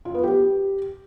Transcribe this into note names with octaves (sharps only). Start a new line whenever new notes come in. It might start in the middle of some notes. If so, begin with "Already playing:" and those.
F4
B3
G4